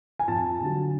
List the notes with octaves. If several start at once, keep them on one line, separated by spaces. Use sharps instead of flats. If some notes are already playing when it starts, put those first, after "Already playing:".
G#5
F2 A5
D3 F#3